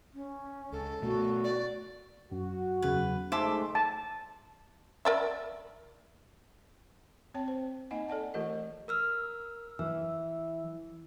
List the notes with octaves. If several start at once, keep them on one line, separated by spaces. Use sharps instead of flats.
C#4
C#2 A4
B2 A3 B3 F#4
D5
F#2 F#4
E2 C#3 F#3 B4
G#3 A3 D#4 C5 E5 A5 C6 D6
A5
A#4 D5 E5
C4 C#5 G5 A5
C5
A#3 D#4 D#5 F#5 G#5
A4 D5 F#5 A5
E3 A3 F4 G4 A#4 D#5
A#4 E6 F6
E3 E6